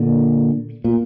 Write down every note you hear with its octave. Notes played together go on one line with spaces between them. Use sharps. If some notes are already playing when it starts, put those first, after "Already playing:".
Already playing: A#2 D3
A#2